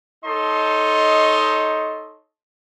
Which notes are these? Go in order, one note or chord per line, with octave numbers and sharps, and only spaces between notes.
D#4 A4 C#5 D#5 C6